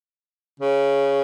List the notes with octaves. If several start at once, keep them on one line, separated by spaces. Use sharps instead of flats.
C#3